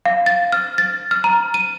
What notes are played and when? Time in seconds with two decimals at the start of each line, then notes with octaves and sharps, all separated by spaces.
0.06 F5
0.26 A6
0.52 F6
0.78 A6
1.11 F6
1.24 A#5
1.54 D#7